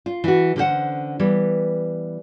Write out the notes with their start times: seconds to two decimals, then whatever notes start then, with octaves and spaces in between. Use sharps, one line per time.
0.06 F4
0.24 E3 F#4
0.56 D3 C#4 G4 A4 C5 F#5
1.19 E3 G3 B3